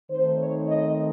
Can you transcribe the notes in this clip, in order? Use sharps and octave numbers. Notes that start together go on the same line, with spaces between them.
D#3 A3 C4 D#4 C5
C#5
D#5